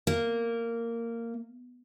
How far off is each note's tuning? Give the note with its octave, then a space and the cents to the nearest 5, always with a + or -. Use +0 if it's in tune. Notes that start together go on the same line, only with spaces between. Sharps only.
A#3 -10